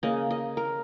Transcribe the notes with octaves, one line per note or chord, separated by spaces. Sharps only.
C#3 A#3 D#5
D#5
A#4